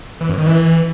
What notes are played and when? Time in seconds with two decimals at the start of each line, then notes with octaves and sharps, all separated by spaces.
0.21 E3
0.29 F#2
0.38 D#3
0.46 E3